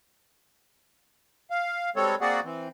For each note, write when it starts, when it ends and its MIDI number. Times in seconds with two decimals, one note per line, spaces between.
1.50 1.90 77
1.96 2.15 55
1.96 2.15 56
1.96 2.15 60
1.96 2.15 69
1.96 2.15 73
2.21 2.40 58
2.21 2.40 60
2.21 2.40 66
2.21 2.40 68
2.21 2.40 74
2.21 2.40 78
2.44 2.68 52
2.44 2.68 60